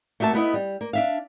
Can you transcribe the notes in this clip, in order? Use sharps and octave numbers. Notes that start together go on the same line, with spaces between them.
A3 A#3 F#4 E5 A5
A3 B3 E4 D#5
G3
A#3
D4 E5 F5